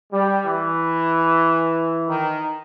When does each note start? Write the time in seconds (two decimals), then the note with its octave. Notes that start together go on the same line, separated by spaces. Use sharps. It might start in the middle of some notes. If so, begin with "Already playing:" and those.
0.12 G3
0.45 E3
2.09 D#3